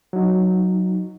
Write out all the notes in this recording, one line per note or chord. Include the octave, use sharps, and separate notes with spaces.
F#3 D#4